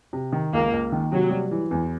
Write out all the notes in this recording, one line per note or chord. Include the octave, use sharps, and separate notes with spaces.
C3
D#3
C#2 A#3
C#2
D#3
C3 F#3
G3
E3
E2